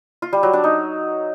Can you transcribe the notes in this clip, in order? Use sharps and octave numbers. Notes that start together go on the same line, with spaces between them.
F4
G3
F#3
D4
D#4